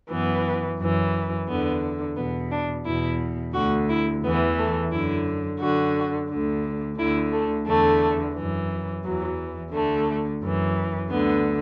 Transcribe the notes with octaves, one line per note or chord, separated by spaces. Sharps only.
F#2 E3 B3
F#2 E3
E2 D3 B3
E2 B2 B3
D4
E2 B2 E4
D2 D3 F#4
E4
E2 E3 B3
A3
F#2 D3 E4
F#2 D3 F#4
D2 D3
D2 D3 E4
A3
E2 D3 A3
F#2 E3
E2 E3 F#3
D2 D3 A3
F#2 E3
D2 D3 B3